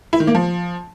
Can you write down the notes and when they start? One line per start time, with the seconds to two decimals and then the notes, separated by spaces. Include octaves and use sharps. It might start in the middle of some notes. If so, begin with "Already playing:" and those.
0.13 E4
0.20 D#3
0.27 A#3
0.35 F3